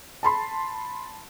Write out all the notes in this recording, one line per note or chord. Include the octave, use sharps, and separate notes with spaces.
A5 B5 C6